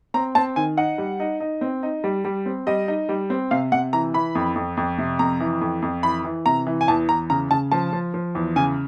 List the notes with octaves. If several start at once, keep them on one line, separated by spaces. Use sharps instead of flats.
C4 A#5
C4 A5
D#3 G#5
D#4 F#5
G3
D#4
D#4
C4
D#4
G3
G3
C4
G3 D#5
D#4
G3
C4
C3 F5
C3 F#5
E3 A#5
E3 B5
F2
F2
F2
C3
F2 A#5
E3
F2
F2
E3 B5
E3
C3 A#5
E3
G#5
E2 A5
E2 A#5
C#3 A#5
C#3 A5
F3 A5
F3
F3
E2
C#3 G#5